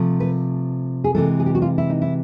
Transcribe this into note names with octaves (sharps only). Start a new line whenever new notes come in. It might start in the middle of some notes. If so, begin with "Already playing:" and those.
Already playing: C3 F3 A3
B4
G#4
C3 E3 G#3 A4
G#4
G4
F#4
F4
E4
D#4
E4